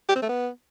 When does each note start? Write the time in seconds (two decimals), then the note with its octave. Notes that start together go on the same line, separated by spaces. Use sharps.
0.09 G4
0.16 C4
0.22 A3
0.29 B3